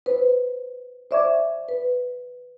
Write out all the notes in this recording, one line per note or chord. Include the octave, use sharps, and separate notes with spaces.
B4 C5
C5 D5 E5 C#6 D6 G#6
B4